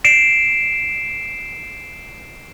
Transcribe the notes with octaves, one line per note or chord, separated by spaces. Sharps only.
C7 D7 E7